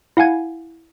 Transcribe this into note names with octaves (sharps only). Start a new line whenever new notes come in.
E4 F5 F#5 G#5 G#6